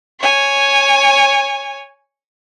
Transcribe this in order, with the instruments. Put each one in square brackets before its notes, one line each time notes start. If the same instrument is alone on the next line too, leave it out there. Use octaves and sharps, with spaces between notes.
[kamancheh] C#5 G#5